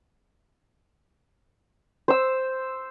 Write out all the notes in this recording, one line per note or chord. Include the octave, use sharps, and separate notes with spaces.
C5 E6